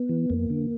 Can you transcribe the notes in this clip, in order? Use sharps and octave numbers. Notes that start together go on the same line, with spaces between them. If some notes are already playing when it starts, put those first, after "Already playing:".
Already playing: B3
E3
F2 A#3
D3